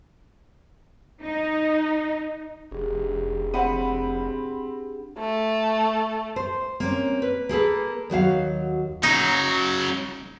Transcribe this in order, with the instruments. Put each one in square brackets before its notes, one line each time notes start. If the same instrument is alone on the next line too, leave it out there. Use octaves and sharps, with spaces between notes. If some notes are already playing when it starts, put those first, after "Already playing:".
[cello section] D#4
[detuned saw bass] F1 [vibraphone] D4 G4 G#4
[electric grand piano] C4 B5 D#7 [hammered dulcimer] F#5
[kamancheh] A3
[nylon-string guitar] C5
A#3 C4 C#4
B4
A#3 G#4 A4 B4
D#2 F#3 F#4 F5
[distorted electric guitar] C#3 F#3 [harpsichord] D#4